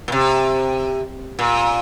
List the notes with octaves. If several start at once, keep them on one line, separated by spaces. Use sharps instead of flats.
A#2
C3
A#2